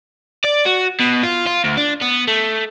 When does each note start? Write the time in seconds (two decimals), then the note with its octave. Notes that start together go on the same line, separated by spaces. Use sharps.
0.44 D5
0.65 F#4
1.00 B2
1.23 F4
1.47 F4
1.64 D2
1.77 D4
2.02 B3
2.28 A3